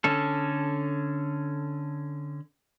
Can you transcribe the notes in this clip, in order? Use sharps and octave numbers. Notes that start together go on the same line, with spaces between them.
D3 C#4 A4